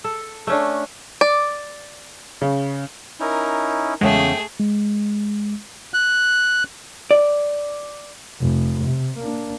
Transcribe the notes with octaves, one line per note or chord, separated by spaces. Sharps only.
A4
A3 C#4 D4
D5
C#3
C#4 D#4 E4 A#4
E2 C#3 G#3 A3 C#4 G#4 G5
G#3
F#6
D5
F1
C3
A#3 D4